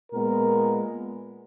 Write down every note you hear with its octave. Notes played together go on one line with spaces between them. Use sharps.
A#2 G#3 B3 A#4